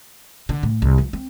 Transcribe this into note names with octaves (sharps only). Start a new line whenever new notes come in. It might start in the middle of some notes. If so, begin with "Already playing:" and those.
D3
A2
C2
F3
C4